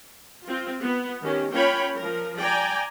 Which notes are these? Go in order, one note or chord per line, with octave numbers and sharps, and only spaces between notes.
C4 F4
B3
D#3 C#4 G4
A#3 C#4 F4 C#5 G5 B5
F3 A#4
D5 G5 G#5 A#5